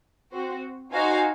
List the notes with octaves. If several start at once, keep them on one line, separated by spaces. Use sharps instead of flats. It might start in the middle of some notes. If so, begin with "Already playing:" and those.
C4 F#4 C5
D#4 F#4 C5 F5 G#5